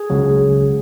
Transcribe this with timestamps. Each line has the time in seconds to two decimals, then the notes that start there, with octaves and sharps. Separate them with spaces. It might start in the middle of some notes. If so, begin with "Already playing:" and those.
Already playing: G#4
0.10 C#2 C#3 F#3